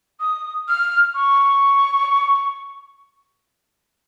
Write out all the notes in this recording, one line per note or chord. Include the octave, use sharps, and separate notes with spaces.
D#6
F6
C#6